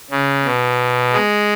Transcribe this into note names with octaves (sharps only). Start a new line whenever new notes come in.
C#3
B2
G#3